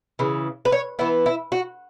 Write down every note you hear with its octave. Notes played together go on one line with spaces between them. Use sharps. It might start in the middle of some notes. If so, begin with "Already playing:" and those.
C#3 E3
B4
C#5
E3 B3 E4
E4
F#4